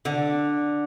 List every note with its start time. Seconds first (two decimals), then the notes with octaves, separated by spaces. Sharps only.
0.05 D3